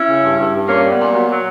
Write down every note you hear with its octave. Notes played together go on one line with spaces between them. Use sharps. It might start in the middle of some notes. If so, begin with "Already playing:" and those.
Already playing: C#4 E4
C#3
G2
G2
G2
A#2 A#3 C#4
G3
B3
A#2
F#3 B3
F#3